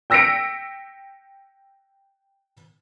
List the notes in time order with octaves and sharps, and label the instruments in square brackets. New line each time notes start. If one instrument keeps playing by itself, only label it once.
[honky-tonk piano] G5 E6 A#6 B6 C#7 D7